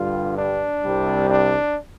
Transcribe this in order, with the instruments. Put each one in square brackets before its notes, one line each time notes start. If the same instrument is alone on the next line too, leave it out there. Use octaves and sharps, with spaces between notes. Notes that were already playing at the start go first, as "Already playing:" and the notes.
Already playing: [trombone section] G2 D3 G3 F4
D4
C2 C3 G3
D4